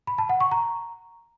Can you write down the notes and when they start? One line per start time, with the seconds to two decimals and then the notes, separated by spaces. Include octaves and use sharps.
0.07 B5
0.18 A5
0.29 F#5
0.40 C#6
0.52 A#5